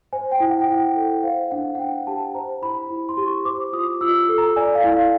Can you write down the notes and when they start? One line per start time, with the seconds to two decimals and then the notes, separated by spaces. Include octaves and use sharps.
0.13 C5 G#5
0.32 G5
0.40 E4
0.50 F#5
0.60 G5
0.68 E4 F#5
0.96 A4
1.23 C5 F5
1.51 D4 F#5
1.75 F#5
1.79 D4 G5
2.07 G4 A5
2.35 C5 A#5
2.62 E4 B5
2.90 E4
3.09 C6
3.17 G4
3.27 C#6
3.45 C5 D6
3.73 F4 D#6
4.01 F4 E6
4.29 A4
4.38 A#5
4.56 D5 G#5
4.75 F5
4.84 E4
4.94 F5